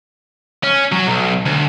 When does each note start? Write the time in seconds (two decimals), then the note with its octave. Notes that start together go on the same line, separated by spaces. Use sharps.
0.64 C#4
0.92 F#3
1.07 B1
1.46 D2